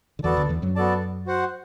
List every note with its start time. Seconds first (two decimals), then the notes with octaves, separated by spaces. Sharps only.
0.19 D3
0.24 E2 E3 B3 F#4 A4 D5 A5
0.37 D2 D3
0.49 E2 E3
0.62 F#2 F#3
0.76 B3 F#4 A4 D5 A5
1.26 F#4 C5 F#5